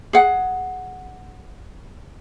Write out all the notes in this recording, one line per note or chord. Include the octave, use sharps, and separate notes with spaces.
G#4 F#5